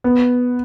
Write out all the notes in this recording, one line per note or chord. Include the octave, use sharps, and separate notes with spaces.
B3